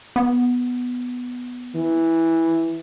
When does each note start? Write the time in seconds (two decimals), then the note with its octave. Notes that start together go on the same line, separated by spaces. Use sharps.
0.16 B3
1.75 E3